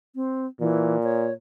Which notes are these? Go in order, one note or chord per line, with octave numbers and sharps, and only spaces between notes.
C4
A#2 E3
C#5